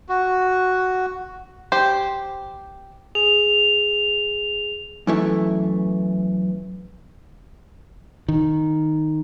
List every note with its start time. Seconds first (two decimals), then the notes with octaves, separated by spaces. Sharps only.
0.09 F#4
1.72 G4 C5
3.15 G#4 F7
5.07 F#2 E3 A3
8.28 D#3